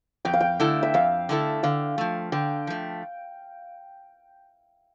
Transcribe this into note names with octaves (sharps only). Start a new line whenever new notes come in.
F2 G5
F5
G5
D3 A3 E4 A4
E5
F2 F5
D3 A3 E4 A4
D3 F5
F3 A3
D3 G5
F3 A3